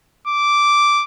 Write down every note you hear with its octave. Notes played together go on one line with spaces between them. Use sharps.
D6